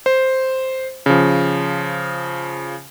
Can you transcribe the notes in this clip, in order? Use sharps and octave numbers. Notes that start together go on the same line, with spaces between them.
C5
C#3 F3